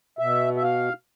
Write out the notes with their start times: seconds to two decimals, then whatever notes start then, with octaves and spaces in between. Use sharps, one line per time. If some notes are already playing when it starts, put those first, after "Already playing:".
0.19 B2 E5
0.56 E5
0.63 F5